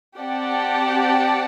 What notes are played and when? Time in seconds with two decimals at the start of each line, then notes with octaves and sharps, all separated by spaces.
0.19 C4 G4 D5 F#5 A5